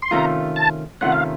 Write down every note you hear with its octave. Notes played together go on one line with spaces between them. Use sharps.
C6
C3 D#3 A3 C#4 F4 A#5
A5
C3 D#3 A3 C#4 F4 F#5
F5